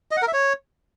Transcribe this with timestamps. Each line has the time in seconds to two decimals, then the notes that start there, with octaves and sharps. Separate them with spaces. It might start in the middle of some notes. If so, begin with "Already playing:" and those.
0.11 D#5
0.17 F#5
0.22 A#4
0.28 E5
0.33 C#5